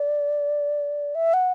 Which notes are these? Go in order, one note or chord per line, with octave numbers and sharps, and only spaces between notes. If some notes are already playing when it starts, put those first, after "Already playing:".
Already playing: D5
E5
F#5